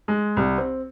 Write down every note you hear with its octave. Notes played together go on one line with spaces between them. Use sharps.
G#3
C2
C4